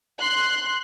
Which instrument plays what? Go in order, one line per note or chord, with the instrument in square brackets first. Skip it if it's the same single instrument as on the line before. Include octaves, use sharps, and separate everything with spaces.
[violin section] C6 F#6